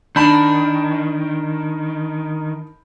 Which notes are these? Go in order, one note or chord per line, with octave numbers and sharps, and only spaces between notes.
D#3 D4 A5 B5 G6